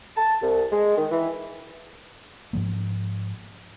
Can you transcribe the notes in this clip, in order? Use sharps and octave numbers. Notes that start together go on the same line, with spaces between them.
A5
C2
G#3
D#3
E3
G#2 F3 A#3